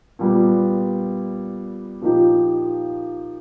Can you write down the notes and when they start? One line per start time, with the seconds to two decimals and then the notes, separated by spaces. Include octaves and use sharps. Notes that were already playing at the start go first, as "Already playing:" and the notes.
0.19 A#2 G3 B3
2.02 A#2 F3 A#3 D#4 G4